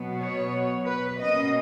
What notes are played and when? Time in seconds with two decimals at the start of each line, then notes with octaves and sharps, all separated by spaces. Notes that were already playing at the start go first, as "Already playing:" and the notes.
Already playing: B2 F#3 B3
0.19 C#5
0.85 B4
1.19 B2 A#3 C#4 D#5